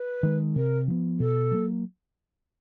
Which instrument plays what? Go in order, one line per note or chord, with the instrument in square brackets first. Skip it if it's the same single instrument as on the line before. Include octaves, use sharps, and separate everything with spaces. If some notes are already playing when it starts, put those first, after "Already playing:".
Already playing: [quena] B4
[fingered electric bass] D#3 G#3
[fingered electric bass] C3 [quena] A#4
[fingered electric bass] F3 G#3 B3
[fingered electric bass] B2 [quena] A4
[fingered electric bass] F#3 A#3